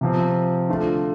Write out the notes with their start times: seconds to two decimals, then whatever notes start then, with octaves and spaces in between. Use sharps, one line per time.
0.01 C3 F3 C4
0.69 D3 A3 F4